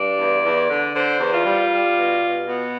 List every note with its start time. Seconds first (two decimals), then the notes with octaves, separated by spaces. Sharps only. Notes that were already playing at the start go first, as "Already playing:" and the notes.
Already playing: G2 D5
0.18 E2
0.43 E2
0.69 D3
0.94 D3 C5
1.19 E2
1.32 F4
1.45 G3
1.71 G3
1.95 B2
2.21 B2
2.46 B2 B3